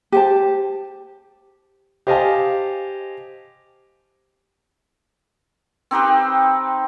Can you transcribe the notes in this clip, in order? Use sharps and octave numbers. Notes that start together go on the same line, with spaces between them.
G4 C5 A5
G4 C5 D#5 F5 G#5 A5
C4 D#4 G4 B4